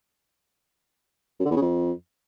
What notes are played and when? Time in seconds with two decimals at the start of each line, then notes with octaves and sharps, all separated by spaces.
1.40 F#2
1.45 D3
1.51 E2
1.56 C#3
1.62 F2